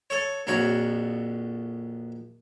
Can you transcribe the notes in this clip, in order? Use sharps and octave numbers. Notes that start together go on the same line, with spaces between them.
A4 C#5
A#1 F2 F#4 C#5